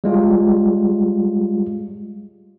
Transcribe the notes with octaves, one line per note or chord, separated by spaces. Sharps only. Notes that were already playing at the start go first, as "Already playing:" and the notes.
G3 G#3 F4